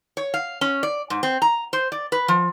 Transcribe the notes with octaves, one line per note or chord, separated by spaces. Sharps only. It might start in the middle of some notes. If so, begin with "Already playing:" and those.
C#5
F5
C#4
D5
G#2
C4
A#5
C5
D5
B4
F3